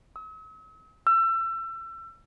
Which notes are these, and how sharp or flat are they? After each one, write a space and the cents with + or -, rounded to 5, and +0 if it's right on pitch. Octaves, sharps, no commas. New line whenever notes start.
E6 -45
E6 +30